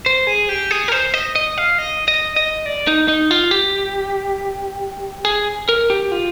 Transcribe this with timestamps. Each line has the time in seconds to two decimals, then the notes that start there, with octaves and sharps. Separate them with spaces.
0.06 C5
0.27 G#4
0.49 G4
0.71 G#4
0.88 A#4
0.92 C5
1.14 D#5
1.35 D#5
1.58 F5
1.78 D#5
2.08 D#5
2.36 D#5
2.66 D5
2.87 D#4
3.08 D#4
3.31 F4
3.51 G4
5.25 G#4
5.69 A#4
5.90 G4
6.12 F4